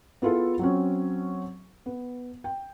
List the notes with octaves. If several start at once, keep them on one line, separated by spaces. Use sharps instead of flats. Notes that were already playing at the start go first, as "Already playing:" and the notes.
B3 E4 F4 G#4 A4
F#3 C4 C#4
B3
G5